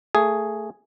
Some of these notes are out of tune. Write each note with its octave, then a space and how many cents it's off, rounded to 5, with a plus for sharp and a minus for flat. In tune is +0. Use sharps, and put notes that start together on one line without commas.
A3 +20 G#4 +0